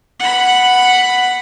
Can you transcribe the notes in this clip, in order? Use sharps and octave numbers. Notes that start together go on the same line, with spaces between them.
F#5 B5